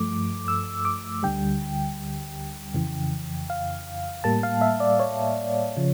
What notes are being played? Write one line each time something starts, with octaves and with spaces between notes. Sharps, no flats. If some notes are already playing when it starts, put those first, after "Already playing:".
Already playing: G2 F3 A3 D6
E6
D6
D2 D3 G3 G5
F2 C#3 E3
F5
A2 G3 A#3 A5
F5
E5
D5
C#5
C#3 F3